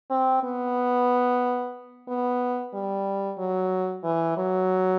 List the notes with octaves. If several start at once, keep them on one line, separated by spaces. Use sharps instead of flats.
C4
B3
B3
G3
F#3
E3
F#3